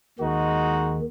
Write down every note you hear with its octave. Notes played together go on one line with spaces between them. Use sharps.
D#2 D#3 G#3 D#4 F#4